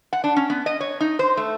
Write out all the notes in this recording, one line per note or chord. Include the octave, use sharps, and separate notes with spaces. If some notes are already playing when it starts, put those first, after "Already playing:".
F#5
D4
C#4
B3
D#5
C#5
D#4
C5
A3